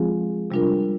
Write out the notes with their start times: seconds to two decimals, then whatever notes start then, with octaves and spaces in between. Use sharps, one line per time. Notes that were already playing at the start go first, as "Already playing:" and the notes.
Already playing: F3 G#3 C4 F4 G#4
0.51 C3 G3 D4 F4 A#4